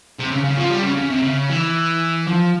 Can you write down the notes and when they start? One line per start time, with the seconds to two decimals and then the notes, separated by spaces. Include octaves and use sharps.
0.19 C3
0.31 C#3
0.44 C#3
0.57 F3
0.70 G3
0.83 C#3
0.97 C#3
1.10 C3
1.22 C#3
1.49 E3
2.27 F3